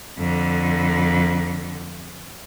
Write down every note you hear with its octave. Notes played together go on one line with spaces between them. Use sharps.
F2 D3